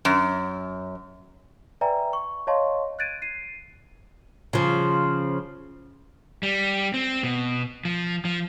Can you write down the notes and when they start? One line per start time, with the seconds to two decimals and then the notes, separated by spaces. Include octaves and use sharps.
0.05 F#2
1.81 B4 D5 E5 G5 G#5 A#5
2.13 C#6
2.47 C#5 D#5 F5 A5 C6 C#6
2.99 F#6 G#6 A6 D7 D#7
3.22 C7 D#7
4.53 C#3 F3
6.43 G3
6.94 C4
7.23 B2
7.85 F3
8.25 F3